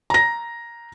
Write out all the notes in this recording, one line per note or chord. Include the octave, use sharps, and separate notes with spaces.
A#5 A#6